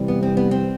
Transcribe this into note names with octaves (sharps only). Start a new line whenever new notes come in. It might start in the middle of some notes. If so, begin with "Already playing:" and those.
Already playing: C3 E3 G3
B3
C4
B3
C4